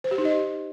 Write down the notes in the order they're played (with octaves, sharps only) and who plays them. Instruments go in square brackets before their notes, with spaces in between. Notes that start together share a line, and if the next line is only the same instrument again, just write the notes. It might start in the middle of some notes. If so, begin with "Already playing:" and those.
[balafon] C5
G4
D#4
D#5